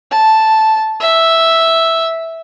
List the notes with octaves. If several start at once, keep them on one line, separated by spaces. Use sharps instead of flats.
A5
E5